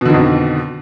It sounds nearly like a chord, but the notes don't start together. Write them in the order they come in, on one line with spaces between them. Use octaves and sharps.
B2 D3 D#3 F2